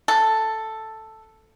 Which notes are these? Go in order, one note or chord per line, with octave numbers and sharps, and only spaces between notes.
A4